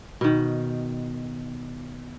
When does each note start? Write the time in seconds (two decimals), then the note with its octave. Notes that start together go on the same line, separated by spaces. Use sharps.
0.21 B2 D#3